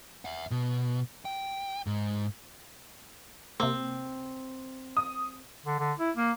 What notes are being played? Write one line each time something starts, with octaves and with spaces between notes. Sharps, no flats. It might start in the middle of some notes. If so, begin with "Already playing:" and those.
E5 F#5
B2
G5
G#2
C3 A#3 C4
D#6
D3
D3
E4
A#3